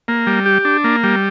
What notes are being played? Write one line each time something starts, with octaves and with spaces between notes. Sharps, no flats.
A#3
G3
G4
D4
A#3
G3